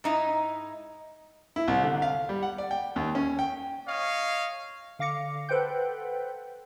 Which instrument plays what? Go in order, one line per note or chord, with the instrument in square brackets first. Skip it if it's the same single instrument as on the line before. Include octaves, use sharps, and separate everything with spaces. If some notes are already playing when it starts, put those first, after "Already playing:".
[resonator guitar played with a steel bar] G#2 D#4 E4
[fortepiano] E4
C2
D3
F5
G3
F#5
D5
G5
D#2
C#4
G5
[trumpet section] C#5 D#5 F5
[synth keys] D3 F5 D6 A#6 C#7
A4 B4 C5 F#5 G5 G6